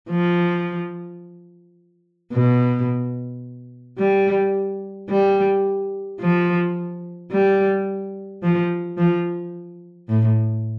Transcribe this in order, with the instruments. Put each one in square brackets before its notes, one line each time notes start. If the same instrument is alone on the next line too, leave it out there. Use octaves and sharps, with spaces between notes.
[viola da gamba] F3
B2
G3
G3
F3
G3
F3
F3
A2